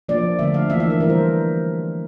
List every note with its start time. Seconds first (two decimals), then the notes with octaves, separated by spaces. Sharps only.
0.09 F3 A#3 D4 D5
0.39 D3 A3 D4 E5
0.54 F5
0.70 E3 A#3 D4 E5
0.80 E5
0.90 A#4
1.00 E3 G3 D4 A#4
1.10 C5